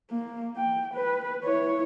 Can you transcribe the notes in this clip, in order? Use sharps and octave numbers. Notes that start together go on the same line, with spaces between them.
A#3
G5
B4
E4 C#5